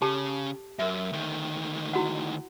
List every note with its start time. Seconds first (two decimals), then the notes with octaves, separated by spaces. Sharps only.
0.02 C#3 G4 A4 A5
0.79 F#2 A#4 E5
1.13 D2 D#3
1.93 E4 F#4 F#5